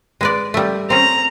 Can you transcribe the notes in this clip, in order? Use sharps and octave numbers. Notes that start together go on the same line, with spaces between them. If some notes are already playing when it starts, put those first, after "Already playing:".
G#3 B4 D5
G3 A3
C4 C#4 A#5